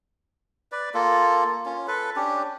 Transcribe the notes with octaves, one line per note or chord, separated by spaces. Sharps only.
B4 D5
A#3 F4 A4
C#4 F4
A4 B4
C#4 D4 G4